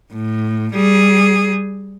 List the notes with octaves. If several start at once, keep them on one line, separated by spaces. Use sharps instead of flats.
A2
G3 G#4